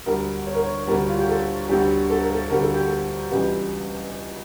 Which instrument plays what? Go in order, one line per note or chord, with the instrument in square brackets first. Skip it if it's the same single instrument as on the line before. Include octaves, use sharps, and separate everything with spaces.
[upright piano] D2 D3 G3 A#4
C#5
A#4
C#5
D2 D3 G3 A#4
F4
G4
A4
D2 D3 G3 G4
A4
A#4
A4
D2 D3 G3 A#4
A4
G4
A4
C#2 C#3 E3 G3 G4